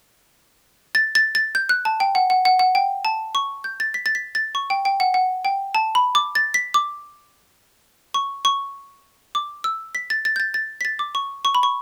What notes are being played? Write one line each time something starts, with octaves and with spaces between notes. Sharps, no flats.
A6
A6
A6
G6
F#6
A5
G5
F#5
F#5
F#5
F#5
G5
A5
C#6
G6
A6
B6
A6
B6
A6
C#6
G5
G5
F#5
F#5
G5
A5
B5
D6
A6
B6
D6
C#6
C#6
D6
E6
B6
A6
A6
G6
A6
A6
B6
A6
D6
C#6
C#6
B5
C#6